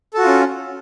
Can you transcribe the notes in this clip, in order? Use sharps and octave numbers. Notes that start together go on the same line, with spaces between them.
C#4 F4 F#4 A4